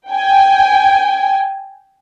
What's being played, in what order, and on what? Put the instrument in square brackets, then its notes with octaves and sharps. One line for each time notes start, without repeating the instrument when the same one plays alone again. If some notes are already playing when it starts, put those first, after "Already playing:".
[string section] G5 G#5